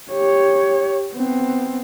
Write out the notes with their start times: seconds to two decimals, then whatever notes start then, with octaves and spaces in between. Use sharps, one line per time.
0.11 G4 C#5
1.14 B3 C4